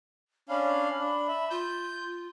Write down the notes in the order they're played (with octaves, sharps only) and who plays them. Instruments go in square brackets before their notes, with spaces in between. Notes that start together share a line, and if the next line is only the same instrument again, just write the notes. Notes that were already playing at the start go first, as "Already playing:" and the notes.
[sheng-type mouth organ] C#4 D4 F5 [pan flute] B5
[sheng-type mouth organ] D4
E5
[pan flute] F4 [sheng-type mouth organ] G6